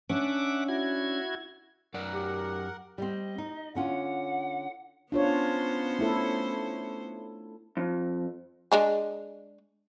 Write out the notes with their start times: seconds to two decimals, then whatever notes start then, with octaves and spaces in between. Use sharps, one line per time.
0.10 C#4 D4 E5 F#5 D6
0.68 E4 F#4 G#6
1.94 F#2 A#4 D5 F#5
2.14 G4
2.98 G3 C4 D#5
3.38 D#4
3.75 D3 C#4 F4 F#5
5.12 B3 C#4 D4 F4 C5 C#5
5.99 A3 E4 A4
7.77 F2
8.72 G#3 D4 G#4